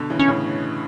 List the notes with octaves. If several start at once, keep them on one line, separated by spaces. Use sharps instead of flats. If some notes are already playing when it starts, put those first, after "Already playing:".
Already playing: B2 D3
C#3 E3
C#4
A2 C#3